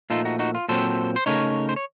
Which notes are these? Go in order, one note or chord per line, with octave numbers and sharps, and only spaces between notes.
A#2 F3 A3 D#4 F4 A4
D#4 F#4
D#4 F#4
F4
A#2 F#3 C4 A4 C5
C5
C#3 A3 D#4 A#4 C#5
C5
C#5